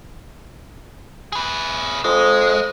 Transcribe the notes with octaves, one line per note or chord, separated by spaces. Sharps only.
G#4 B4
F2 G#3